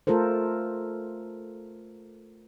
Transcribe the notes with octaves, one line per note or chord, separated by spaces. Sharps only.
A3 F4 A4 A#4 C5